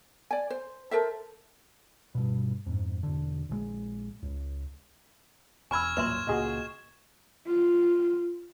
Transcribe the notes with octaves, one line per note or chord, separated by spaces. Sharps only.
D5 G#5
C5
A4 A#4 C5 E5
G2 B2
F2 G#2
E1 D3
A#1 D3 G#3
C#2
E1 G#5 B5 C#6 E6 F6 G#6
D#1 A1 F#2 A#2 B4 E5 C6 E7
C#2 A#2 F#4 G#4 D#5
F4